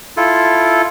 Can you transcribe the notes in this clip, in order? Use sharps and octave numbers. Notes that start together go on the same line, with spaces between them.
E4 F4 A4